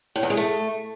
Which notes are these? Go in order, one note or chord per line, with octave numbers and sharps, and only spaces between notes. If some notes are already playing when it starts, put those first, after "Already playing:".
A2
E2
G#3
A3